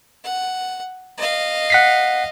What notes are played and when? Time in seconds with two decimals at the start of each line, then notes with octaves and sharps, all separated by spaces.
0.24 F#5
1.17 D#5 F5
1.70 F#5 B6 C7